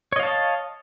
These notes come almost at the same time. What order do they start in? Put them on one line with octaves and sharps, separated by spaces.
C#5 D#5 F5 A5